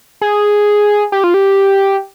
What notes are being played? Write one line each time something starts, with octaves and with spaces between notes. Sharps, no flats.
G#4
G4
F4
G4